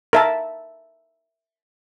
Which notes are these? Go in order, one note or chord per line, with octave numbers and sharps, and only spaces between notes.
A#4 E5 A5